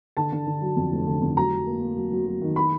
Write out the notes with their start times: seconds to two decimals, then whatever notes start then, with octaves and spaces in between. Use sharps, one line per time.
0.17 D3 A5
0.32 D3
0.47 D3
0.62 F#3
0.76 F2
0.92 F1
1.07 D3
1.22 F2
1.37 F#3 A#5
1.51 F#3
1.67 A#3
1.81 A#3
1.96 F#3
2.12 F#3
2.27 F#3
2.42 D#3
2.56 B5